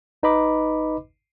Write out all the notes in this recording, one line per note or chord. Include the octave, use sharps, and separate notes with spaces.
G#1 D#4 B4 D#5 B5 D6